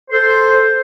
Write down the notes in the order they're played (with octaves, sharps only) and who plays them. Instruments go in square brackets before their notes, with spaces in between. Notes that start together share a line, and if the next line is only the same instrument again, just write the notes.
[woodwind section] A4 C5